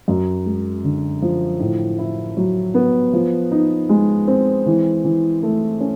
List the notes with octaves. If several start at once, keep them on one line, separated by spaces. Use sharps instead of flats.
F#2
G#3
D3
F3
A2
E4
F#3
B3
F3
D#4
G#3
C4
E3
E3
A3
C#4